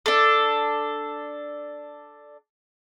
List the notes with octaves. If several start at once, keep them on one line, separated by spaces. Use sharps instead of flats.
D4 A4